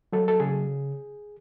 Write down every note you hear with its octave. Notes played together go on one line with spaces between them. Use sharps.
F#3 A4
A4
C#3 G#4